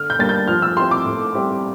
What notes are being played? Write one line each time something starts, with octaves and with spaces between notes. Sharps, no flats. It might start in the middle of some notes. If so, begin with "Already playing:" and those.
Already playing: D3 F6
G6
G3 A#3 D4 A6
G6
F3 F6
E6
C4 E4 G4 C6
D6
A2
G3 C4 E4 G4